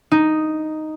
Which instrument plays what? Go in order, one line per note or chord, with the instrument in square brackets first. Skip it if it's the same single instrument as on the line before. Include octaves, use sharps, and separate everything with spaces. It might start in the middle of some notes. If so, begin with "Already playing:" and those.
[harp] D#4